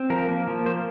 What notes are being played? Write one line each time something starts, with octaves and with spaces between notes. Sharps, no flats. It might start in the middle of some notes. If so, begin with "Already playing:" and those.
Already playing: C4
F3 A#4
A#3
F3
A#3 C5